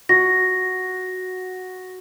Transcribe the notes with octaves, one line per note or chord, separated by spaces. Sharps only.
F#4 A#6